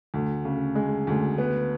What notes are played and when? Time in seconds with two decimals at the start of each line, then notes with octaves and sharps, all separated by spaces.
0.14 D2
0.45 C#3
0.75 G#3
1.07 D2
1.38 B3